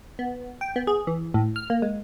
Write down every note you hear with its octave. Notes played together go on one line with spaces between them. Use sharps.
B3
G5
B3
G#4
E3
A2
F6
A#3
G#3